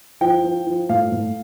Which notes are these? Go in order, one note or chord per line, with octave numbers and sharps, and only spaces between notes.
F3 G5
F3
F3
A2 F5
A2